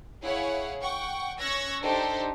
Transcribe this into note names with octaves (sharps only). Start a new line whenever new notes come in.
E4 G#4 C#5 F5 F#5
F#5 G5 C#6
C#4 C#6 E6 F#6 G#6 A#6
D4 D#4 G4 A4 C5